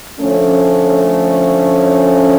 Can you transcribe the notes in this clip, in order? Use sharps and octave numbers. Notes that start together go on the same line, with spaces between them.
D3 F3 A3 C#4